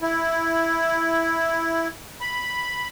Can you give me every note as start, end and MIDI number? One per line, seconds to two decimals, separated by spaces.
0.02 1.88 64
2.21 2.88 83